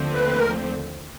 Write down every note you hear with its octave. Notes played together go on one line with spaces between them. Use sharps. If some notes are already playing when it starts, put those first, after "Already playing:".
Already playing: D#2 D3 F3 A3 C4
B4
A#4